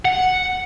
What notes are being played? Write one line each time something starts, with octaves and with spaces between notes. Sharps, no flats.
F#5